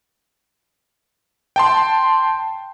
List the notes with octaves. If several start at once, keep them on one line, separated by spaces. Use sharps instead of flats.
G5 A5 C6